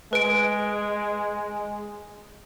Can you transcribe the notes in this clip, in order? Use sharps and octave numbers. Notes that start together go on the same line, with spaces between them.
G#3 B4 D7